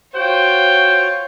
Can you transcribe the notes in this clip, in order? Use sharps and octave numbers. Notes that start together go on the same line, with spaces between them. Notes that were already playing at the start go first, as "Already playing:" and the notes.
F4 F#4 C5 C#5 G5